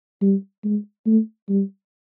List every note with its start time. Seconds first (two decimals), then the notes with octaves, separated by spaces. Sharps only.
0.22 G3
0.64 G#3
1.06 A3
1.49 G3